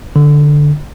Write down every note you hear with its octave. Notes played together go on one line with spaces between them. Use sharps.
D3